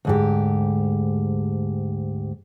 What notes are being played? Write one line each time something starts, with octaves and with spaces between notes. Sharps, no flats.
D2 G#2 G4